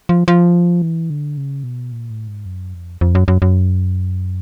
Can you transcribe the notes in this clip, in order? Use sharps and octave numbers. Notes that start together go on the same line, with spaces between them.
F3
F3
E3
D3
C#3
B2
A#2
A2
G#2
F#2
F2
F2
F#2
F#2
F#2